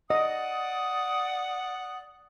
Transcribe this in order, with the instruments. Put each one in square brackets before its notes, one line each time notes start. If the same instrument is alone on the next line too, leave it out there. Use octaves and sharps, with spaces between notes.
[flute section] D5 D#6 [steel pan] D#5 [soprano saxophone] F#5